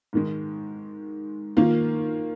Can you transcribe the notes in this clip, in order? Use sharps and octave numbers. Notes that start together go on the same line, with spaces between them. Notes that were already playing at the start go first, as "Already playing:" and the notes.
G#2 D#3 G#3
D#3 A#3 F4